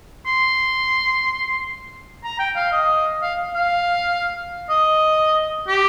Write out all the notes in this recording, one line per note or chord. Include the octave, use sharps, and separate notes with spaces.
C6
A#5
G5
F5
D#5
F5
F5
D#5
G4